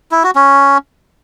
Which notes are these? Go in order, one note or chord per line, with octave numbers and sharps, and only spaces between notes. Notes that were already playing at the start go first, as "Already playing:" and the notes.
E4
F#4
C#4